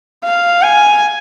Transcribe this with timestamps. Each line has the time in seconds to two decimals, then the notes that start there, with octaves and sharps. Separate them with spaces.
0.24 F5
0.62 G#5